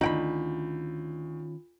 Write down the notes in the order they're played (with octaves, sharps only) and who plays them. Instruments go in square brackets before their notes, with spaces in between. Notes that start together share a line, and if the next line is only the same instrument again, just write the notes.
[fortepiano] D2 [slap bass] D#3 C#4 [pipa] D#4 G5 B5 [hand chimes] F4